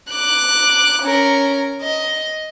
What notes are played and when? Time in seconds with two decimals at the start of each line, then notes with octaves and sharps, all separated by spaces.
0.11 D6 F#6
1.03 C#4 A#4
1.81 D#5